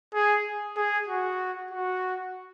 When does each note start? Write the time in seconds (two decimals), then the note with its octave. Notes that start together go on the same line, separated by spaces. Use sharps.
0.14 G#4
0.77 G#4
1.08 F#4
1.71 F#4